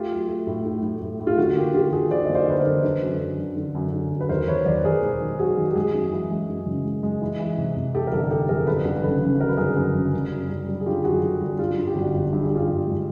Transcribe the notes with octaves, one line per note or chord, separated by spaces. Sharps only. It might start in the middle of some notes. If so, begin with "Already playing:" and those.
Already playing: A3 F4 G4
F#3
A3
A2
A2
A2
A2
A2
F4
D3 F#4
F#4
A#3 F4 G4
D3 F4 G4
D3 F#4 G#4
D3 C5 D5
A#3 D#5
C5 D5
D3 B4
A#4 C5
D3
D3 A4 B4
F#2
D3
D3
D3
F#2
D3
F#3
B4
D#2 A#4 C5
D#2 B4 C#5
D#2 C5 D5
D#2 G#4 A#4
E1
D#3
F#3 F#4 G#4
D#3
G4
G#3 F#4 G#4
F#2
E3
G#3
F#2
C#3
G#3
G#3
E3
E3
C3
C3
E3 G4 A4
A#4
G1 G4 A4
E3 G4 A4
F2 G#4 A#4
G1 A4 B4
G1
C#3 A4 B4
C#3
F#3 A#4
B4
G1 G#4 A#4
F#2
C#3
G3
F#2
G3
G3
G#4
D3 F4 G4
F#2 F#4 G#4
D3
G3 F#4
G2 F4
G2
G4
G1 F#4
G1
G2 G4
G#4
G2 F4 G4
G1
G#3